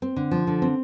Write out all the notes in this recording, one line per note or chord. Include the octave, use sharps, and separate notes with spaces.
C4
D3
F3
D3
C4